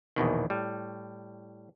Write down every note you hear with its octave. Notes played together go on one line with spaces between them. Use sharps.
A#1 E2 B2 D#3
A2 G3